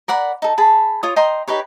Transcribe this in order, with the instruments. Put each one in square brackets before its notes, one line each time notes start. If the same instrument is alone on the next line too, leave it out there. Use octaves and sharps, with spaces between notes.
[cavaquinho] A#4 D5 F#5 B5
D#4 A4
G#4 A5 B5
F4 C#5 D#6
D#5 G5 A#5 C6
D#4 G4 B4 C#5